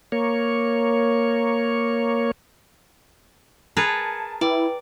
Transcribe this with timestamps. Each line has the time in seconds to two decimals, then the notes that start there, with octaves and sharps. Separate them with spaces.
0.12 A#3 C#5
3.77 G#4 A#4 B4 A5 G#6 C#7
4.41 E4 B4 D5 G5